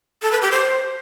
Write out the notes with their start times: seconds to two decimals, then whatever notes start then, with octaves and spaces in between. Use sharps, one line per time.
0.22 A4
0.32 B4
0.42 G4
0.51 C5